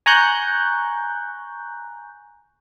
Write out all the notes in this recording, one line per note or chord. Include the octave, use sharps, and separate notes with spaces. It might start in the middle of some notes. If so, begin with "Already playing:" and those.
G#5 A#5 C#6 F#6 G6